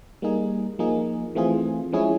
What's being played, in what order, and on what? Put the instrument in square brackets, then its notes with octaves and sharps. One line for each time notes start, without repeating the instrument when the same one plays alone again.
[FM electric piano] G3 A#3 D#4 G#4
F3 A#3 D#4 G#4
E3 A3 C4 F4 G#4
F3 G#3 C#4 E4 G#4